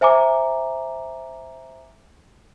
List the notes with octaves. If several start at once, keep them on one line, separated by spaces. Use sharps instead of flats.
C5 E5 G#5 A#5 D6